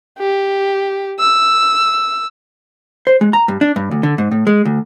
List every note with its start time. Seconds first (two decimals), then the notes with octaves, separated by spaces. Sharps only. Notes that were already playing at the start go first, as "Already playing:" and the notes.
0.18 G4
1.19 E6
3.07 C5
3.21 G#3
3.33 A#5
3.48 G2
3.61 D4
3.76 G2
3.91 D2
4.03 D3
4.18 G#2
4.31 A2
4.47 G#3
4.65 D2